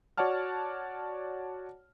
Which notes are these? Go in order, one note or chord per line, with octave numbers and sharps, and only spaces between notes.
F#4 C#5 D5 F#5 A5 F6